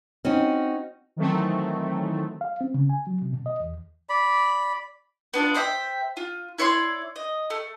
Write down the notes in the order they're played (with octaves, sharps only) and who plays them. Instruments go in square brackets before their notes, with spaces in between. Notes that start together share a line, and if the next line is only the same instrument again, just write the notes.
[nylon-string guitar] C4 [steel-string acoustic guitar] C#4 D#4 F#4
[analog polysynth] D#3 E3 F#3 A3 C4
[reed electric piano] F5
C4
C#3
G#5
F#3
C3
B2
D#5
E2
[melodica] D5 B5
[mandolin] B3 D4 F4 D5
C5 D5 E5 G5
F4
E4 C#5 D5 C6
D#5
A3